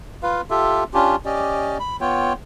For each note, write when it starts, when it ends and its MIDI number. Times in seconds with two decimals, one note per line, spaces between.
0.23 0.41 65
0.23 0.41 71
0.23 0.41 77
0.50 0.84 65
0.50 0.84 67
0.50 0.84 69
0.50 0.84 76
0.94 1.16 61
0.94 1.16 62
0.94 1.16 65
0.94 1.16 67
1.25 1.78 61
1.25 1.78 67
1.25 1.78 74
1.25 1.78 75
1.80 1.97 83
2.01 2.33 59
2.01 2.33 65
2.01 2.33 73
2.01 2.33 79